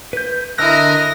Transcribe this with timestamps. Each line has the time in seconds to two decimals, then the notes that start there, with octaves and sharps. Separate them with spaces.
0.13 B4 G6
0.58 D3 E4 A#4 D#5 E6 F#6 A#6